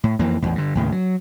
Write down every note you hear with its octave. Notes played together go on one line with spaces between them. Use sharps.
A2
F2 E3 A#3
A1 E2 A2
G2 D3
D#2 A2 C#3
F#3